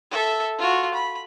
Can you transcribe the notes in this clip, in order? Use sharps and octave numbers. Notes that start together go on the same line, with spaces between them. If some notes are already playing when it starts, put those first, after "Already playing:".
A4 E5
F4 F#4
B5